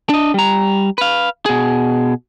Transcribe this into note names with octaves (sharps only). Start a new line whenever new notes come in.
D4 D#5
G3 A#5
B4 F5
B2 G#4